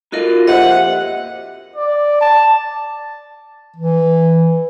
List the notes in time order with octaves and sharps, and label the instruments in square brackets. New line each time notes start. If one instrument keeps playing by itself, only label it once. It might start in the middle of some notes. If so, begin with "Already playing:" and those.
[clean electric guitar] D#4 F4 D#5 [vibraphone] F#4 A4 A#4
[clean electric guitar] F2 A#2 [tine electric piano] G4 C5 E5 [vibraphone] D#5 [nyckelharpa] F#5
[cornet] D5
A5
[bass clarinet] E3